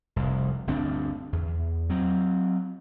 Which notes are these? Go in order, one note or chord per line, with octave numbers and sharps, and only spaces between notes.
F1 C2
G1 D2 C4 D4
E2
F#3 C4